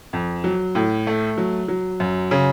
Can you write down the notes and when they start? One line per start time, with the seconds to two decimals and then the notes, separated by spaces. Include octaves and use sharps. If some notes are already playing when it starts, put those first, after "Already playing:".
0.13 F2
0.44 F#3
0.75 A2
1.07 A3
1.38 F#3
1.68 F#3
2.00 F#2
2.31 C#3